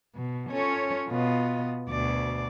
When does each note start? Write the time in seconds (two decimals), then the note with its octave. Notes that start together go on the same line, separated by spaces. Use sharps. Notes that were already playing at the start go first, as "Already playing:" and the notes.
0.15 B2
0.51 C#4 F4 A4 C#5
1.09 B2 B3 F4 D#5
1.89 D2 B2 D5